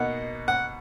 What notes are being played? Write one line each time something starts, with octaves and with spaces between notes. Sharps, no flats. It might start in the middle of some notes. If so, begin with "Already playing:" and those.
Already playing: B2 A#3 D#4 F#5
F#5